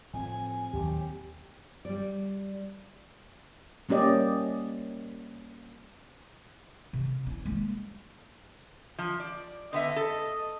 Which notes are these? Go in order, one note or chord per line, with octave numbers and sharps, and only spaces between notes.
A2 F3 C4 G#5
D#2 A#2 F#3 G4
G3 D5
G3 A#3 C#4 G4 D5 D#5
C3
C#4 E4
G#3 A#3
F3
D5
D3 B3 D#5 E5
A4